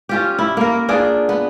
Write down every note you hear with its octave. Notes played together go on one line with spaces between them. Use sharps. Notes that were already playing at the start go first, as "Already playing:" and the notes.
C#4 F4 G4
E4
A#3 A#4
D4 F4 G#4 D5
B3